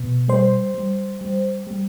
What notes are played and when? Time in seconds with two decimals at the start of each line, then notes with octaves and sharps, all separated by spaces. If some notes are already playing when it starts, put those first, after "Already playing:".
Already playing: B2
0.28 G3 C5
0.74 G3
1.21 G3
1.67 G3